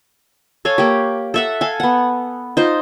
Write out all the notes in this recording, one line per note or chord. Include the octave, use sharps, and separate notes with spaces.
A4 C#5 F5 G#5
A#3 G4
A4 E5 F#5
A4 F5 G#5
B3 F#5
D#4 F4 C5